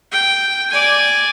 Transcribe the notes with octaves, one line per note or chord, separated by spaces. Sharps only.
G5
D5 G#5